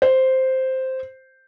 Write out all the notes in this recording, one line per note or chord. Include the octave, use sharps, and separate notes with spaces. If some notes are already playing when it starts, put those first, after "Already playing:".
C5